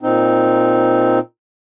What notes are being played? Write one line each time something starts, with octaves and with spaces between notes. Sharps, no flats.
A#2 C4 D#4